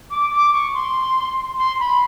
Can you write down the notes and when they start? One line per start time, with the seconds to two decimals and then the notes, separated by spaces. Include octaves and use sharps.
0.10 D6
0.32 D6
0.53 C#6
0.74 C6
1.58 C6
1.80 B5